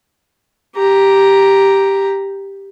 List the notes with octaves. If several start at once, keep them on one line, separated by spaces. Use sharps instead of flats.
G4 A#5